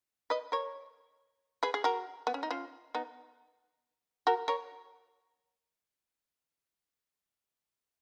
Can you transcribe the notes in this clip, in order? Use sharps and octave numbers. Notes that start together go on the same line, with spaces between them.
B4 D#5
A#4 C#5
G#4 B4
G#4
F#4 A#4
B3
C#4
D#4
C#4 F4
B3 D#4
F#4 A#4
A#4 C#5